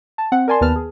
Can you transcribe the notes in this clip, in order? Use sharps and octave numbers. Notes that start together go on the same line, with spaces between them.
A5
C4 F#5
A#4 D5 G#5 A5 C6
D#2 B3 B4 A5 F6
G#4